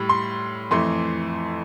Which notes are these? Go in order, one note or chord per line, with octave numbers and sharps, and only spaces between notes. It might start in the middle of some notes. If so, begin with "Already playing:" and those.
Already playing: A2 G3
C6
F2 E3 A3 C6